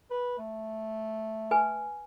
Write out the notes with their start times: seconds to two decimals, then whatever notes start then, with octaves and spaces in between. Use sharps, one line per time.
0.11 B4
0.38 A3
1.51 B4 G#5